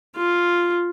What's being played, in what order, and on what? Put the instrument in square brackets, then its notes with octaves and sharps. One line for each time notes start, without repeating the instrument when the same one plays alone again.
[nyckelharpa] F4